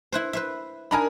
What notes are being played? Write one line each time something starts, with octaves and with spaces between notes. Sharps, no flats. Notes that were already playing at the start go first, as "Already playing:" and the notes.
E4 B4 C5
B4 C5 E5
D4 D#4 A#4 G#5 A#5 B5